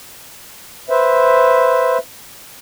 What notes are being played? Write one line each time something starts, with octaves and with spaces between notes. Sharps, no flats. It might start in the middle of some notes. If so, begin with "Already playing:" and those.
B4 C5 E5